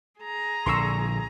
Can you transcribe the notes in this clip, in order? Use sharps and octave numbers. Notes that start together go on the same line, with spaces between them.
G#4 A#5
A#1 D3 C6 C#6 E6